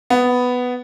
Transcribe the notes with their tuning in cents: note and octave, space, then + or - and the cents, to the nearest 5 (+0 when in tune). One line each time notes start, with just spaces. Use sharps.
B3 +5